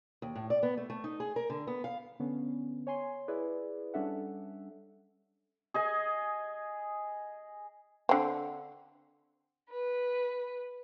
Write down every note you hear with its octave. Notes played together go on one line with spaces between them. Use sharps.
D#2
A2
D5
B3
A3
A3
D#4
G#4
A#4
D3
B3
F5
D3 B3 C#4
C#5 G#5 C6
E4 G#4 B4 D5
G3 C#4 D4 A4 E5 F#5
G#4 D#5 G#5
D3 C4
B4